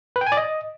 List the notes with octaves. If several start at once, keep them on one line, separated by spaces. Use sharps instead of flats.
B4
G5
G#5
D5
D#5